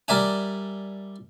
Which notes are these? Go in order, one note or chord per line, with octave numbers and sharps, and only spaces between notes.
G3 A#4 D5 E5 G#5